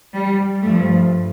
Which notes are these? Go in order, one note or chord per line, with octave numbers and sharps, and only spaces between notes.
G3
G2 F3 A3